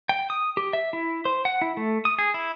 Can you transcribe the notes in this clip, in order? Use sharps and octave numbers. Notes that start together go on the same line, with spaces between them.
G5
D#6
G4
E5
E4
C5
F#5
E4
A3
D#6
G#4
E4